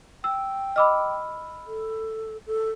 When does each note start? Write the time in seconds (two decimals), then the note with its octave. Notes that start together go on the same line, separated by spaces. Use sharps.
0.24 G5 E6
0.76 D#5 B5 D6 E6 F6
1.67 A4
2.46 A4